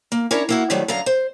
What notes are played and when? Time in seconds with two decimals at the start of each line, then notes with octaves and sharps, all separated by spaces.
0.12 A#3
0.31 C#4 D4 E4 A#4 C#5
0.49 A#3 E4 F#4
0.70 C3 D#3 F#3 G3 A3
0.88 F#2 D3 F5 A#5
1.06 C5